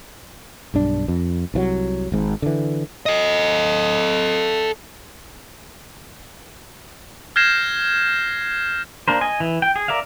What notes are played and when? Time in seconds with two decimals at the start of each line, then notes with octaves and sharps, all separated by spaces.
0.74 B1 G2 D4
1.08 F2
1.54 C2 E3 F#3
2.12 G#1 G#2
2.42 D3 E3
3.06 A4 D#5
7.36 F6 G6 G#6 A#6 C7 E7
9.08 A#3 D4 A#4 C5
9.21 D#5 G#5
9.40 E3
9.62 G5
9.76 G#4
9.88 A#4 D5 E5 F5